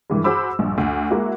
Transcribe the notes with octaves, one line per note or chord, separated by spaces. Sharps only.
G2 D#3 E3 G#3
F#4 G#4 C5 B5 D6 E6
A#1 G2
D2
G#3 A#3 E4 F#4